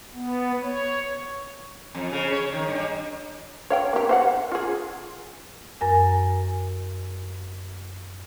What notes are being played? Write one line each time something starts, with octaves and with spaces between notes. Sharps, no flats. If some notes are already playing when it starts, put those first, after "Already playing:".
B3
C#5
F2
C#3
C#5
D#3
G2
C#5 F5 G5
A#3 G4
C5 F5 F#5
F4 G#4
F#2 A#4 G#5